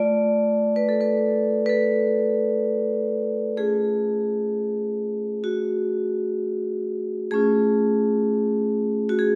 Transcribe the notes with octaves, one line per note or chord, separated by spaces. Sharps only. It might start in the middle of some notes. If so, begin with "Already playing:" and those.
Already playing: A3 F4 D5
B4
A4
B4
B4
A4
A3 C#4 F4 G#4
F#4
A3 C#4 F4 G#4
F#4
G#4